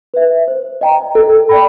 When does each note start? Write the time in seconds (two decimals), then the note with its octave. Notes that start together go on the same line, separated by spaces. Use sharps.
0.14 B4 E5
0.48 C5
0.81 D#5 G5 A#5
1.15 A4
1.49 D5 G5 B5